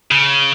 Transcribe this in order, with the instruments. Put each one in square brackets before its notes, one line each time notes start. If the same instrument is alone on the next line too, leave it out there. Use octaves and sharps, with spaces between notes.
[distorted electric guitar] C#3